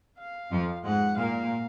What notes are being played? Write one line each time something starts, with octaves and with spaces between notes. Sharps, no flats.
F5
F2 F3
G#2 G#3 F#5
A#2 A#3 F5